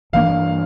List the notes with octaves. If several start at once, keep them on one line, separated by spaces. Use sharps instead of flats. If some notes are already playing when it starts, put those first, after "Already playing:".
G2 E3 A#3 D4 F5